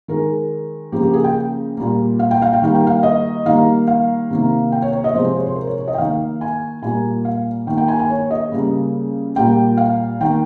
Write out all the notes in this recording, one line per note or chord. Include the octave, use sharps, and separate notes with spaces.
D#3 G#3 A#4
C#3 F3 A#3 G4
G4
G#4
G5
A#2 G3 A#3
F5
G5
F5
G5
D#3 G3 A#3 F5
G5
F5
D#5
D#3 G3 A#3 F5
F5
C3 D#3 A#3
G5
C#5
C#5
D#5
C3 F3 G#3 C5
C5
C#5
C5
A#4
C#5
C#5
D#5
G5
D#3 A#3 F5
G#5
A#2 G3 A#3 G#5
F5
D#3 A#3 G5
G5
G#5
G#5
C#5
D#5
C#3 G3 A#3
A#2 G3 A#3 G5
F5
D#3 A#3 G5